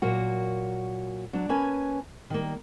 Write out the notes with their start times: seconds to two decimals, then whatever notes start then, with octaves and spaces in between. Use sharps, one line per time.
0.02 A#2 F#3 A#3 F#4
1.33 F#3 D4
1.49 A#3 C#4 B4 G#5 A5
2.30 D#3 G3 A#3